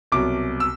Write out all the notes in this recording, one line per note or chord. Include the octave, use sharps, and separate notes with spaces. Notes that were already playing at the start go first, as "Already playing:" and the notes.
C2 B2 F#3 D6
E6